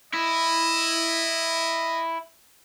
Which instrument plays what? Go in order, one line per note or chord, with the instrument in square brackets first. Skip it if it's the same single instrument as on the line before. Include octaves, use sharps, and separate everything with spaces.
[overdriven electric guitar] E4 [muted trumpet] D#5